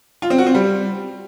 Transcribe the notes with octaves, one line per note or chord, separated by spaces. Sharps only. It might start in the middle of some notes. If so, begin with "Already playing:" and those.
F4
C4
F#4
C4
G3